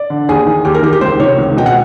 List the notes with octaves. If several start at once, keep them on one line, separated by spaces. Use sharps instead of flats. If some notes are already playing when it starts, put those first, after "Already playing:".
Already playing: D5
D3
D#2 G#4
D#3
D#2 G4
A#4
D#3 G4
G4
C#2 C5
C3 D#3 C#5
C#2
B2 G5
F#5